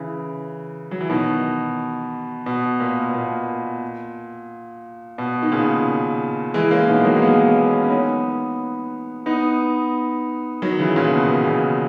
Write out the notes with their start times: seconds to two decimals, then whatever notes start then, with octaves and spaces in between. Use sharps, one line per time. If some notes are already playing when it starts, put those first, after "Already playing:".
Already playing: C#3 E3
0.91 F#3
1.01 E3
1.10 B2 D#3
2.46 B2
2.80 A#2
3.09 B2
3.14 A#2
5.18 B2
5.42 D#3
5.52 A#2 C#3
6.54 E3 G#3
6.71 A#3 C#4
6.88 B2 D#3
7.01 G#3
7.05 F#3 A#3
7.17 A#3
7.22 G#3 B3
7.56 A#3 C#4
7.83 C#4
7.90 B3 D#4
9.26 B3 D#4
10.62 D#3 F#3
10.79 C#3 E3
10.96 A#2 C#3
11.13 B2
11.30 B2
11.47 A#2 C#3